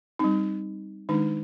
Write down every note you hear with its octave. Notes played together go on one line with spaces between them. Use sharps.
G3 C4 D#4
D#3 G#3 D4 D#4